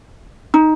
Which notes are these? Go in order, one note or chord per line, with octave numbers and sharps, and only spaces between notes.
D#4